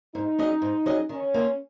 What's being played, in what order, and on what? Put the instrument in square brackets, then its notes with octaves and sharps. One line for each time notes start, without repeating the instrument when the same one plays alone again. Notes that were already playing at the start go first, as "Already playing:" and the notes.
[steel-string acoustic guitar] G#2 [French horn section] D#4
[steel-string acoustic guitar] F#3 C#4 G#4 D#5
G#2
F#3 C#4 G#4 D#5
[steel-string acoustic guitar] D#3 [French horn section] C#4
[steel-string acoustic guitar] A#3 F4